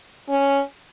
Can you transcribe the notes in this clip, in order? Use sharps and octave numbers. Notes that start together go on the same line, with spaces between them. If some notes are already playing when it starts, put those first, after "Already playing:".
C#4